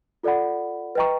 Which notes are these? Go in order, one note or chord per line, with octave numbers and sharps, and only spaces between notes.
F4 A4 D5 F#5 B5
B4 D#5 G5 A#5 C#6